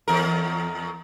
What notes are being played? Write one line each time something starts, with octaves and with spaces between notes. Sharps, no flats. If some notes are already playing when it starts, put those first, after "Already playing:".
E2 A#4